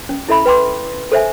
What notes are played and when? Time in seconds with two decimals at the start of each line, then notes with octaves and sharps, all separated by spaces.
0.09 C#4
0.29 E4 A4 E5 B5
0.46 B4 G5 C6 D6
1.12 A4 C5 E5 G#5